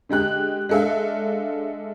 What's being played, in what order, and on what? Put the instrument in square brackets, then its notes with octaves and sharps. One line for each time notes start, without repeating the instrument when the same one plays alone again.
[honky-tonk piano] D3 G#3 G4 F#6
G#3 D4 A4 E5 F5